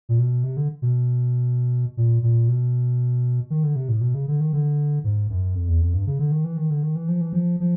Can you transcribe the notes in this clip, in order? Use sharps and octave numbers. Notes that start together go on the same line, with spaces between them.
A#2
B2
C3
D3
B2
A#2
A#2
B2
D#3
D3
C3
A2
B2
C#3
D3
D#3
D3
G#2
F#2
F2
E2
F2
G2
C#3
D3
D#3
E3
D#3
D3
D#3
E3
F3
E3
F3
F3